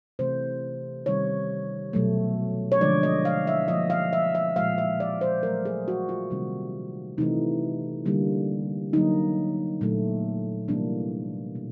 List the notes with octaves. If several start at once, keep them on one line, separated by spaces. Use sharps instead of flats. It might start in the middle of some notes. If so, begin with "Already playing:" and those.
C3 E3 A3 C5
C3 D#3 G3 C#5
B2 F#3 A3
C#5
D3 F3 G#3 D5
D#5
F5
E5
D3 F3 A#3 D#5
F5
E5
E5
A#2 F3 G#3 F5
E5
D5
C5
D#3 F#3 A3 A#4
G#4
F#4
F4
C3 D#3 G3 A#3
C3 E3 A3 D#4
D3 G3 A#3
D3 F#3 A#3 D#4
A#2 F#3 A3
C3 E3 G3 A#3 D4
B2